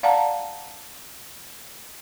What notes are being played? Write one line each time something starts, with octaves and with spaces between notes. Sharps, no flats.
D5 F5 F#5 A5 A#5